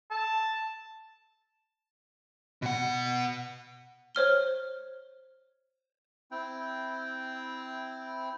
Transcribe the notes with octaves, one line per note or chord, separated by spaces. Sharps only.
A5
B2 F#5
C5 C#5 F6 G7
C4 E4 G5